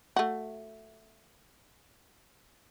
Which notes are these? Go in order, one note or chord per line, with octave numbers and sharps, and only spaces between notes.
A3 F#4